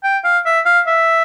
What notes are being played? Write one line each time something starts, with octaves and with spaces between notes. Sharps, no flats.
G5
F5
E5
F5
E5